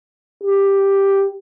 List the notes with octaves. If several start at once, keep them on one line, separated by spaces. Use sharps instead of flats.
G4